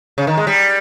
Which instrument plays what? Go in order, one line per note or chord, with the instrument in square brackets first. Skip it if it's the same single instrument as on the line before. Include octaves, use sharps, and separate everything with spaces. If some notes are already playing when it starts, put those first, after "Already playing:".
[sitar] C#3
D#3
G#3
G3